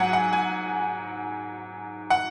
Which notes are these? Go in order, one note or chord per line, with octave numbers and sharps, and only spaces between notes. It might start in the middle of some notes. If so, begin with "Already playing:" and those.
Already playing: G#2 F#3 F#5 G#5
F#5
G#5
F#5